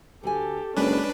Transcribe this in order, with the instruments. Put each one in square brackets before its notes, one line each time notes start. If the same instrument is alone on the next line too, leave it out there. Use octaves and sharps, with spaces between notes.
[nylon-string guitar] D2 F#4 G#5 [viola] G4 A4
[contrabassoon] F#1 [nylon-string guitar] G#3 [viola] C#4 [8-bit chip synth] D4 B4